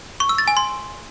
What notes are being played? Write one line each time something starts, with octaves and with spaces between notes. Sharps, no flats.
C#6
E6
A6
G#5
C6